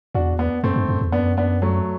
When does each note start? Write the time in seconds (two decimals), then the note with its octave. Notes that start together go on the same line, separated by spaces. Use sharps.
0.15 E2 D4 F#4
0.39 B3 D4
0.64 F#2 A3 C4
0.76 G2
0.89 F#2
1.01 E2
1.12 F#2 B3 D4
1.37 B3 D4
1.62 F#3 A3